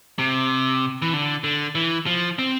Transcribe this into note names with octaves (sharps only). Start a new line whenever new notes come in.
C3
E3
D3
D3
E3
F3
C4